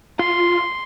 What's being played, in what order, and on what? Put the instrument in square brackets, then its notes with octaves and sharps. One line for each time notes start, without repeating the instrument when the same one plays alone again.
[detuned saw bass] F4 [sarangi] C6